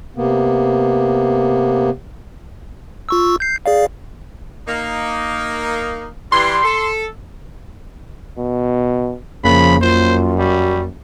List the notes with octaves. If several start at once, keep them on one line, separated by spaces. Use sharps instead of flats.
C3 A#3 B3
F4 C#6 E6
G6 C7
G#4 D5 F5
A#3 D#4
E3 G3 G4 C6
A4
B2
F2 C#3 F3 A#3 B5
F#2 F4 C5
G3 F#4